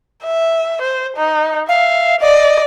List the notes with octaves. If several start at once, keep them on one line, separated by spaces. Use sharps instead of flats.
E5
C5
D#4
E5 F5
D5 D#5